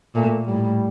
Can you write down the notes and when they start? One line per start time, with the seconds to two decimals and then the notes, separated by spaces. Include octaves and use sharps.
0.15 A#2 A3
0.47 A2 G3